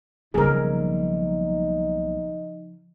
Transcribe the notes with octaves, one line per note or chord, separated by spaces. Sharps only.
B1 C#3 F3 G3 A#3 D#4 G#4 A#4